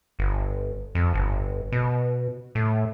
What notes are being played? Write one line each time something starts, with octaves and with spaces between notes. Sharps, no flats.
G1
F2
G1
B2
A2